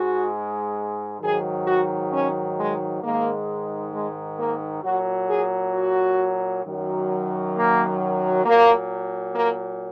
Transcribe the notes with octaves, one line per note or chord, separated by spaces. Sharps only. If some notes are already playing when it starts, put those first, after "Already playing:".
Already playing: G#2 G#3 F#4
G#2 D#3 F#3 G#4
F#4
C#4
G#3
G#2 D#3 G#3 A#3
G#3
A#3
A#2 F#3 F#4
G#4
F#4
F#2 D#3 F#3
A#3
A#2 F#3 A#3
A#3